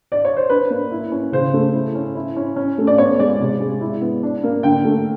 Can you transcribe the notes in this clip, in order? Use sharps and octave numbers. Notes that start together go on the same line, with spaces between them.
D5
C#5
C5
D4 B4
A#3
E4
C#4
C#3 C5
A3
E4
C#4
E4
C#4
C#4
A3
D5
B3 C#5
G#3 D5
C3
G#3
E4
B3
D4
A#3
D3 G5
A3